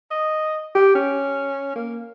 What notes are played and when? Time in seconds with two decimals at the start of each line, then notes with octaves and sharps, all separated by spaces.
0.11 D#5
0.75 G4
0.95 C#4
1.76 A#3